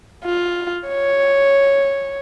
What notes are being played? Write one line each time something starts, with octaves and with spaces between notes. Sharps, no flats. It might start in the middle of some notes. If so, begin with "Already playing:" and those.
F4
C#5